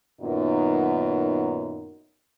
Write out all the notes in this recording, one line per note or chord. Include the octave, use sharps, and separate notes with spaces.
F#2 A#2 D#3 F#3 B3 D#4